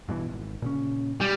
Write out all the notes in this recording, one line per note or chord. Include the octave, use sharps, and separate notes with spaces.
G2 B2 E3
G#1
A#2 C#3 C#4
G3